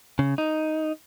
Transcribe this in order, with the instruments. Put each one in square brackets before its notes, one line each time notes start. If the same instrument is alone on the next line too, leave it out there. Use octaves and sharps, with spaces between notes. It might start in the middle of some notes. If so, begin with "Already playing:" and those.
[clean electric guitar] C#3
D#4